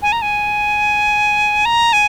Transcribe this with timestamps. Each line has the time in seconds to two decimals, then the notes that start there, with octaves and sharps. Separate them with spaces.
0.02 G#5
0.12 A#5
0.22 G#5
1.65 A#5
1.93 G#5